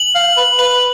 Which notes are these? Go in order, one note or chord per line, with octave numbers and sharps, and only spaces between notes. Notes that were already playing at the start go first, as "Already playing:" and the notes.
Already playing: F#7
F5
B4
B4 F#7